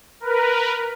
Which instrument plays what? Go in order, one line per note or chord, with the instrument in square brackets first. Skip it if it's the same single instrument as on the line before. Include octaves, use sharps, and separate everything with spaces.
[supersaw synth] A#4 B4